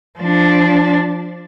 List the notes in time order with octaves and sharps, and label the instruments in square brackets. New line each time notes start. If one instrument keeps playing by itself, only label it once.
[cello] F3 D4